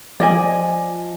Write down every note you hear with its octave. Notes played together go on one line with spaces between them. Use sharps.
F3 D5 D#5 G#5